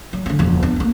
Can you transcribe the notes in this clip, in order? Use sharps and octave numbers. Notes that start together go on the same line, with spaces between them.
F#3
D3 C#4
D#1 F2
B3 D4
C2 A#3